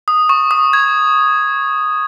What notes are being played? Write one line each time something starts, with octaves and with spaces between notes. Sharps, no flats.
D#6
C#6
D#6
G#6